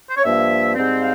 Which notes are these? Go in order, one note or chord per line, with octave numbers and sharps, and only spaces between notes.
C5
C#5
G2 F3 A#3 E5
G#2 G3 C4
F5